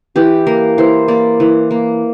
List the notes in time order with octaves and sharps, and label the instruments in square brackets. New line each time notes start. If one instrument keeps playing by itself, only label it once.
[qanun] E3 G4
A#3 A#4
E3 C5
A#3 D5
E3
A#3